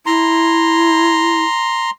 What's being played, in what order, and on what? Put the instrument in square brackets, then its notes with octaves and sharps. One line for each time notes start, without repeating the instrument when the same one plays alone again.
[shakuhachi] E4 [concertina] A#5 C6